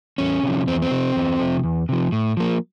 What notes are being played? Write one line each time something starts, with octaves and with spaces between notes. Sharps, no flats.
E2 C#4
C3 F3
E2 C4
C4
C3 F3
E2
C3 F3
E2
C3 F3
A2
F3 A#3